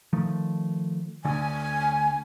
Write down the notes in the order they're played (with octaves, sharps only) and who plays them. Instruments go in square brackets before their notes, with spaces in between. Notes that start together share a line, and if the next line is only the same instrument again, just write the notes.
[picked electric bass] D#3 F3 A3
[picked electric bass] D2 D3 [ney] G#5